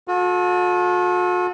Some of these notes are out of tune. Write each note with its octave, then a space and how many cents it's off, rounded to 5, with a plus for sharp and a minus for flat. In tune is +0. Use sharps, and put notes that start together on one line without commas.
F#4 -45 A4 -15